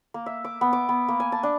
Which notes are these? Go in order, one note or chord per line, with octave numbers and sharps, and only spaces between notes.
A#3
E5
D6
B3
D6
B3
A#3
G#5
A5
D4